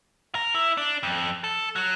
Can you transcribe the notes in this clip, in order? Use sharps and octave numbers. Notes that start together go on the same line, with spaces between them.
A#4
E4
D4
F2
A4
F#3